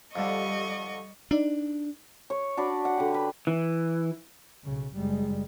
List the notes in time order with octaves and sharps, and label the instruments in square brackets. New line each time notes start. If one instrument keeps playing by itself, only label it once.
[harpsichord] F2 D3 [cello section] G3 [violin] D#5 C#6
[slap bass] D4 [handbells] D#4 D5
[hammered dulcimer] C#5
D4 F#4 D5 B5
F#5
D3 G4
B4
[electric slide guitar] E3
[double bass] B1 C#3
[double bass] F#1 G3 [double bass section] G#3